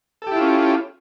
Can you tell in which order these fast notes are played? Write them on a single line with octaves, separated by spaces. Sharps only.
A4 G4 E4 F4 C#4